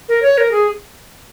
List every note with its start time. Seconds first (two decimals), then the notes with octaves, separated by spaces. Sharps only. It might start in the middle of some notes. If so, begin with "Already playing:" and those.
0.09 A#4
0.22 C#5
0.38 A#4
0.51 G#4